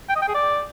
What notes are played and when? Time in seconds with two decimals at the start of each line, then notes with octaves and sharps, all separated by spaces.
0.10 G5
0.16 D#5
0.22 G5
0.28 G#4
0.35 D5